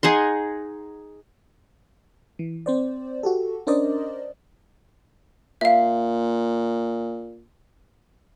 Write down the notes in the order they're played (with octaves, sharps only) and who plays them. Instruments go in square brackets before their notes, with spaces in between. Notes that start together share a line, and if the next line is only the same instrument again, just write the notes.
[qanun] D#4 G#4 F#5 C6
[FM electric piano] E3
C4 C5 D5
F#4 G4 A4
C#4 D4 A#4 C5 D5 D#5
[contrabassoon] A#2 [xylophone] E5 F5